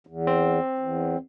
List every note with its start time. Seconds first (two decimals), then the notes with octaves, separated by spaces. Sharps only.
0.07 E2
0.27 C4
0.78 E2